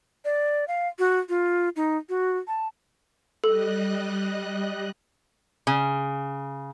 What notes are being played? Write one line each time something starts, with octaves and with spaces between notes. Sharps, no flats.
D5
F5
F#4
F4
D#4
F#4
A5
G3 A4 D#5 F#6
C#3